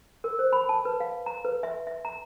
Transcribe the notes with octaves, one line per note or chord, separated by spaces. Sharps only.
A#4
C5
B5
A5
B4
F5
A#5
B4
E5
E5
A#5